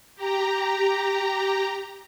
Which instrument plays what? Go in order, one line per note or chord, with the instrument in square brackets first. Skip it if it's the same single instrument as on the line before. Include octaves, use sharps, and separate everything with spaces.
[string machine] G4 A#5